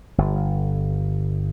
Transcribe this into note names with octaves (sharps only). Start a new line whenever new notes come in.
G1